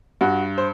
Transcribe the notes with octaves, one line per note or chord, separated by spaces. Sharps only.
G2 F#4
C5